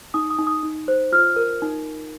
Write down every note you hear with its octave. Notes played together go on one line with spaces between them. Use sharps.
D#4 D#6
D#6
D#4
D#6
D#4
C5
F4 F6
A#4
D#4